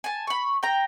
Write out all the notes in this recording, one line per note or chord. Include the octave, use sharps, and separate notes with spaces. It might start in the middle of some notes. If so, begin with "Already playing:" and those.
G#5 A5
B5 C#6
G5 A#5